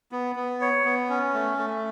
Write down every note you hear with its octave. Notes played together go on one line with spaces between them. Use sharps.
B3
B3
C#5
B3
C#4
A3
A3